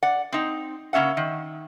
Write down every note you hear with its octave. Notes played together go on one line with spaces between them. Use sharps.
D5 F#5
C4 D#4
C#3 A#3 C#4 E5 F#5
D#3